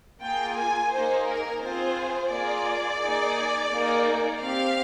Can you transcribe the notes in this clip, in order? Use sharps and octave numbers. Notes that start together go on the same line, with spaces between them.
A#3 F4 G#4 G5
G#5
A#3 D#4 G#4 C5
A#4
C4 F4 G#4 C5
A#3 F4 G#4 D5
A#3 D#4 G#4
A#3 D#4 G#4
C4 G4 F5